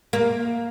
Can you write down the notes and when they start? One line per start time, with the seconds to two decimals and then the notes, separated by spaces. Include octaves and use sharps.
0.13 A#3